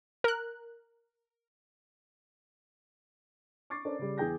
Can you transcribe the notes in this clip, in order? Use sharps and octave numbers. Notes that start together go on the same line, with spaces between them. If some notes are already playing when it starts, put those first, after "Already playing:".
A#4 F#6
C#6 D6 A6 C7
C#4 D4 A4 A#4 C5
C#3 G3
E2 E3 G#4 G5 G6 A#6